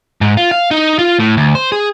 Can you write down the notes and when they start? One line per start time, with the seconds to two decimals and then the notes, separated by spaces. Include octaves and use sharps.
0.21 G#2
0.37 F4
0.51 F5
0.71 D#4
0.99 F4
1.20 A2
1.37 D2
1.55 C5
1.72 G#4